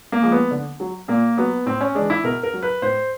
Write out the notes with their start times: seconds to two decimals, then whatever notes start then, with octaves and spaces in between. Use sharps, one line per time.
0.12 A#3
0.22 F3 G#3
0.32 B3
0.51 D3
0.80 F#3
1.08 A#2 A#3
1.38 F#3 B3
1.66 A2 C4
1.81 C#4
1.95 E3 G#3 D4
2.10 E4
2.24 B2 A#4
2.43 A#4
2.53 F#3
2.63 B4
2.82 A2 C5